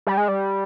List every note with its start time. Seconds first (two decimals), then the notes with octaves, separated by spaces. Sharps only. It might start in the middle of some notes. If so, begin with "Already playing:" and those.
0.07 G3
0.18 G#3
0.28 G3